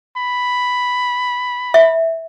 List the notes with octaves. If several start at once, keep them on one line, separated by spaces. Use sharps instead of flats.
B5
E5